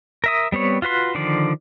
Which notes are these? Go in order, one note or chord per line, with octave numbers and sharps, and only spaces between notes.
A#4 E5 D#6
G3 B3 C4 C#5
F4 F#4 B4 C6
D3 D#3 F3 D5